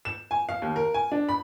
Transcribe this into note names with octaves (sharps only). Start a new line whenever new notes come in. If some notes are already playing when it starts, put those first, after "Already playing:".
E7
G#5
F5
D#2
A#4
G#5
D4
B5